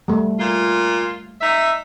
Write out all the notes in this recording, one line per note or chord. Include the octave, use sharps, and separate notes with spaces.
G3 A3
A#2 F4
D#4 E5